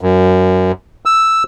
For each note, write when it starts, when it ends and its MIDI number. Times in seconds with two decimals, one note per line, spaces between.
0.01 0.72 42
1.06 1.43 88